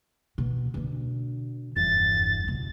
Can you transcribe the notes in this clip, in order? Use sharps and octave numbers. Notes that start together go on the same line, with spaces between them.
B2 E3
B2 D3
F1 E2 G2 A6
C#2 B2